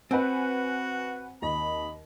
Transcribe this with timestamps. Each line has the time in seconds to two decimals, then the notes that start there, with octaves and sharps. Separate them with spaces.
0.11 C4 F#4 B4 F#5 G#5
1.42 D#2 D#5 B5